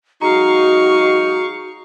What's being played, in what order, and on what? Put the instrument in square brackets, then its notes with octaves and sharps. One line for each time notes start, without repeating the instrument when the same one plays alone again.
[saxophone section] F#3 G#3 D#4 [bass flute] F#4 [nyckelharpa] F5 C#6 [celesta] A#5